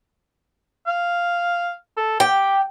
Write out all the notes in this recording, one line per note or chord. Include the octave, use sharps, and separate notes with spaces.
F5
A4
G4 G5